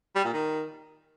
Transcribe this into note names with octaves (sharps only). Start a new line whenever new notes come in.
G3
A#2
D#3